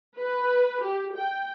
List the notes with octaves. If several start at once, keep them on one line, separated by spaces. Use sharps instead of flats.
B4
G4
G5